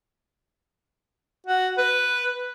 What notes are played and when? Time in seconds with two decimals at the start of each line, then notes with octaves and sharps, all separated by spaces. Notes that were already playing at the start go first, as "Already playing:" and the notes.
1.47 F#4
1.78 B4